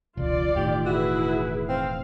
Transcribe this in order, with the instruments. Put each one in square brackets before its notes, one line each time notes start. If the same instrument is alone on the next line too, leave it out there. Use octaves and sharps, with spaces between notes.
[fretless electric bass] E1 C#2 [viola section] F4 D5
[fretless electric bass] E1 A2 D#3 [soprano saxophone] G4
[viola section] E4 G#4 B4 [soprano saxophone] F#4
[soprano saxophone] C4 [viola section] F5